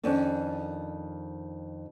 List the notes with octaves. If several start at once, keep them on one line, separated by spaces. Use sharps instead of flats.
F2 D#3 C#4 D4